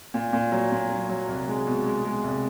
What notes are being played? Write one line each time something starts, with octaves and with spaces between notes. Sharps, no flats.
A#2
A#2
F#3
A#2
F#3
F#3
C2
G#3
B2
G#3
G#3
C2